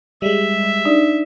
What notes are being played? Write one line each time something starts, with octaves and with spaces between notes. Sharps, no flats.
G3 G#3 E5
D4 D#4 D5